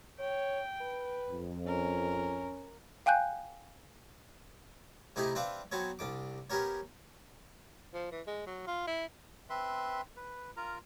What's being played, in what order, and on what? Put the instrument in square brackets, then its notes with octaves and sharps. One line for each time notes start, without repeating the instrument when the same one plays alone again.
[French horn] C#5 [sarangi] G5
[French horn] B4
[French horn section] F2
[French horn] C#4 [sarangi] A#4
[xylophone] F5 G5 G#5 F#6 G6
[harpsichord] C3 A3 D#4 E4 G4 G#4
C4 D4 B4 E5 F5
F#3 B3 C4 A4 C#5
C2 D4 D6
B3 C#4 G4 A#4 C#5
[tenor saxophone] F3
E3
G#3
F#3
F4
E4
[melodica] C4 B4 E5 C6
B4
F4 A#4 A#5